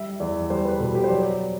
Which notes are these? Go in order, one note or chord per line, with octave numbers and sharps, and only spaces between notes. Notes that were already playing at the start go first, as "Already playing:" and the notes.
Already playing: G3 E5
E2 D5
G3 C5
B4
B2 A4
G4
C5
F#3 D5